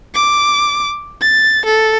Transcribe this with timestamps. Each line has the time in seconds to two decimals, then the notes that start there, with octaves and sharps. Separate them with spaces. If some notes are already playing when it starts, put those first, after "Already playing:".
0.15 D6
1.21 A6
1.65 A4